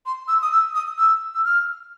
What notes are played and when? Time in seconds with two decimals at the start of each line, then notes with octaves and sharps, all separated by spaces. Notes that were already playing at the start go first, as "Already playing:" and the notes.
0.06 C6
0.28 E6
0.42 D#6
0.52 E6
0.75 D#6
0.98 E6
1.34 E6
1.44 F6